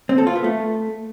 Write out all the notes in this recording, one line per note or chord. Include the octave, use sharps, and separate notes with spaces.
C4
A4
F4
B3
A3